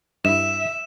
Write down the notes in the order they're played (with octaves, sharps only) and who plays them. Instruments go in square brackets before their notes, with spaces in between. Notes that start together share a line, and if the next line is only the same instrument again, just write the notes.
[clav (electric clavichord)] G2 E4 [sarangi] E5 [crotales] E7